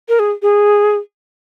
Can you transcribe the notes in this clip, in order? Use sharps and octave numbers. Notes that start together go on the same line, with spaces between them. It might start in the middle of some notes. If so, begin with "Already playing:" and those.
A#4
G#4
G#4